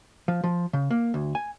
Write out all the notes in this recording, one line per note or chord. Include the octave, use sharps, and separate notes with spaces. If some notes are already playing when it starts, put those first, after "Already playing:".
F3
F3
C#3
A#3
D2
G#5